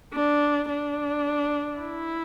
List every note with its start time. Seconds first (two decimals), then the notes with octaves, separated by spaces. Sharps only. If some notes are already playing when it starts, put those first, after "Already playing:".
0.14 D4
0.69 D4
1.79 E4